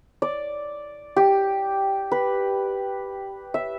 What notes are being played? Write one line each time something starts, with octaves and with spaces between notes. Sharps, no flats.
D5
G4
B4
E5